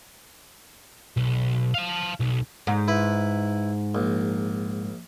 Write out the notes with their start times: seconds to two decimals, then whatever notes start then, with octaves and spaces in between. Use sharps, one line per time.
1.17 B1
1.74 F5 A5
2.20 B1
2.67 G#2
2.88 E4 B4
3.95 A#1